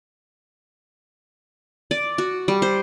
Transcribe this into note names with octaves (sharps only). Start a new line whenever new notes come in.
D5
F#4
G3
C5